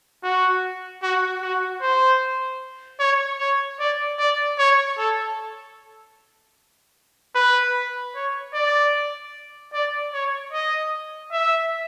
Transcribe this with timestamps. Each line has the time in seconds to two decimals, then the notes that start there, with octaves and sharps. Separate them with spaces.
0.23 F#4
1.03 F#4
1.42 F#4
1.82 C5
3.00 C#5
3.39 C#5
3.80 D5
4.19 D5
4.59 C#5
4.98 A4
7.35 B4
8.15 C#5
8.54 D5
9.74 D5
10.14 C#5
10.53 D#5
11.32 E5